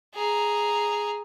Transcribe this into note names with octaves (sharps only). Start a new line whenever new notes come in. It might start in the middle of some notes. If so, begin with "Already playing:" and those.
G#4 A#5